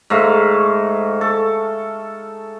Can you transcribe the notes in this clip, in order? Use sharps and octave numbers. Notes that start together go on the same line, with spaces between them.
G#2 A3 F5
A4